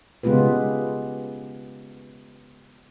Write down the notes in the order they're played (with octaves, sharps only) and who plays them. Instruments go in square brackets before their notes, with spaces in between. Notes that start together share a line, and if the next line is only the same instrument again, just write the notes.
[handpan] C#3 G#3 B3 F4 G4 B4